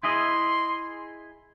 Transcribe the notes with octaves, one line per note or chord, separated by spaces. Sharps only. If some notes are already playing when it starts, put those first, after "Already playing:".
E4 G#4 D#5 C6